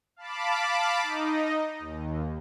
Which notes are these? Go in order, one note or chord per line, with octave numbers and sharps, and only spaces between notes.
F5 A5 B5 D6
D#4 D#5
D#2